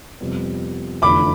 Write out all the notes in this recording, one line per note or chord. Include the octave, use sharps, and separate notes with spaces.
F2 C3 G3 B3
F1 E2 D3 F3 B5 D6